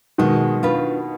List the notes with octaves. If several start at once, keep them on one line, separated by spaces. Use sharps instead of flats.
B2 D#3 G#3
D4 F4 B4